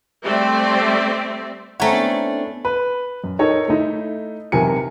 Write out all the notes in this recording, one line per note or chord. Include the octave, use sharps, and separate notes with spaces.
G3 A3 C4 D5 E5
A3 C4 C#4 E4 C#5 F#5 A#5
B3 D4
B4
F#2
D#4 A4 A#4 C#5 D#5
A3 D#4 E4
B1 C3 E3 A#4 G#5 C#7